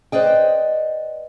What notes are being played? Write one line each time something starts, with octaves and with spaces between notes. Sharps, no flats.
B4 C5 D5 D#5 G5